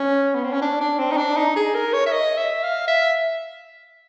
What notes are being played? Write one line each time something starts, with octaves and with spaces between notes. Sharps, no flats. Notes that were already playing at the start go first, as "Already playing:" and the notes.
Already playing: C#4
B3
C4
C#4
D4
D4
C4
D#4
D4
D#4
G#4
A#4
C#5
E5
D#5
E5
F5
E5